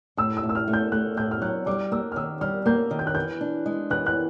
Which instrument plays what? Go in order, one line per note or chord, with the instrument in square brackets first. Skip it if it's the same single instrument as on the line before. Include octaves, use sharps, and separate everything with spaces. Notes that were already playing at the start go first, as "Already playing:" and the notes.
[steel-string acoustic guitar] A2 [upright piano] E6
[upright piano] E6
[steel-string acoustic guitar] A2
[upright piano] E6
F6
[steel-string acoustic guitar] A3
[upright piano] G6
[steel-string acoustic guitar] A3 [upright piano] F#6
[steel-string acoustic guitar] A2 [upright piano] G6
[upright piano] F6
[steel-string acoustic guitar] F#3 [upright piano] F#6
[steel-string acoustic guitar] G3 [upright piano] D6
[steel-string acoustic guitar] A#3 [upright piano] E6
[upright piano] F6
[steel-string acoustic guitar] D#3 [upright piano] E6
[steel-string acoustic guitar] G3 [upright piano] F6
[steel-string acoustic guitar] A#3 [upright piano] G6
[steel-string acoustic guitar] D#3
[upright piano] G6
F#6
[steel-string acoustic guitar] E3 [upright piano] G6
[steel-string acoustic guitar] D4
G#3
[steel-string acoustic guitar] E3 [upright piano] F#6
[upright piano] F#6